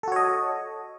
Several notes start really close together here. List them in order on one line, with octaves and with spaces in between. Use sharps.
A4 F#4 C#5 D#5